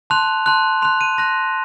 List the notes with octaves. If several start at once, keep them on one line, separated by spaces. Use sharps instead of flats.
A5 C6 F#6 F7
A5 C6 F#6
C6 F#6 F7
D#7
C6 F#6 A#6